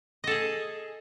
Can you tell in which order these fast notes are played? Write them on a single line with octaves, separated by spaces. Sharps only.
D#5 A4 G#4